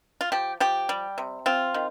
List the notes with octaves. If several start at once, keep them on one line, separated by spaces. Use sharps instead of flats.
F4
F3 G4
F3 G4
G3
C3
C4 F4
D#3